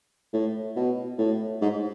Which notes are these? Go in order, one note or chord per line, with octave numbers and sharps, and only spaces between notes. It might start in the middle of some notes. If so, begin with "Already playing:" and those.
A2
B2
A2
G#2